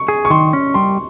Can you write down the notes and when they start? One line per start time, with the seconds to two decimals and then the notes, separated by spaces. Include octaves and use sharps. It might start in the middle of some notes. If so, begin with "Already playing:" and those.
Already playing: C#6
0.08 G#4
0.25 C#6
0.30 D#3 C6
0.53 C#4
0.74 G3 C6